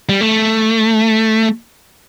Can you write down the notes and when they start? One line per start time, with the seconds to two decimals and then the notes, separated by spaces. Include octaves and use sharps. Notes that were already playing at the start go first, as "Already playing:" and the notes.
0.09 G3
0.21 A3